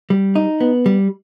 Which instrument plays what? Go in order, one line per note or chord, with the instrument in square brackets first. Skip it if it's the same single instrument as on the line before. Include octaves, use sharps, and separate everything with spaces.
[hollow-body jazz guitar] G3
D#4
B3
G3